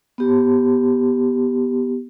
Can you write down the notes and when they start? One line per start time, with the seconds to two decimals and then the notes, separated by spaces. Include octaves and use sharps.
0.18 B3 G4